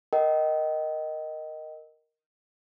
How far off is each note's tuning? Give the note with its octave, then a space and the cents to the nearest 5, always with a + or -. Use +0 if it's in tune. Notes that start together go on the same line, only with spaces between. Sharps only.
A#4 +0 D#5 +0 G5 -35